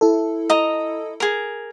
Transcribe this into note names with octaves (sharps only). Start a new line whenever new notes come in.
E4 A4
D#5 A#5
G#4 A#4